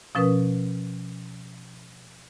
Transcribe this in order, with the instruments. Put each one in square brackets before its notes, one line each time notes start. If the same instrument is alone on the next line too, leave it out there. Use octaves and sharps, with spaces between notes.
[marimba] B2 F3 C#4 A#4 B4 D#6